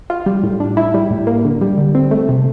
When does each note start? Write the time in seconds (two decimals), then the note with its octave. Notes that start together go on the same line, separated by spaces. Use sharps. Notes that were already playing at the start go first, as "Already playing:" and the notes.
0.10 F4
0.26 G3
0.43 A2
0.60 D4
0.77 E4
0.94 G3
1.11 A2
1.27 A#3
1.45 D3
1.61 G3
1.78 D3
1.95 C4
2.11 A3
2.29 C3